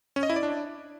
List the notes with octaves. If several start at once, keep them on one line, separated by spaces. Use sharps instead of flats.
C#4
D#5
E4
D5
D4